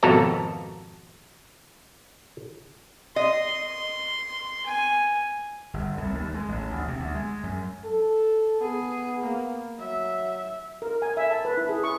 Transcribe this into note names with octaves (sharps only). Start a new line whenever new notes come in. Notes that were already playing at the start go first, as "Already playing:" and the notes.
G#1 F2 B2 A4 A#5
D#5 C6
G#5
G1
C2
D#2
G#3
A1
D2
C3
D2
G#3
F#2
A4
B3 G#4
A#3
F#3 E5
A#4
G#5
E5
A5
B4
E4
G#4
C#6